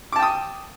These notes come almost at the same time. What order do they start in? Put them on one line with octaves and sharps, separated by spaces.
D6 A5 G5 D#6